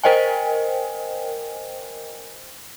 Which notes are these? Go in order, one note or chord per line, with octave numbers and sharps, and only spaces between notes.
A#4 C5 D#5 G5 G#5